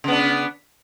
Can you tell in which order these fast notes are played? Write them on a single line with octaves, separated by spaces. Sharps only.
C#3 B3 D4